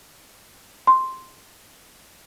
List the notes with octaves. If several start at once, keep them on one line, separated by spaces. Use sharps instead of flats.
C6